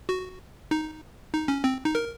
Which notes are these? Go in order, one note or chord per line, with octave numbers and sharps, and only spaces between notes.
F#4
D#4
D#4
C#4
C4
D#4
A#4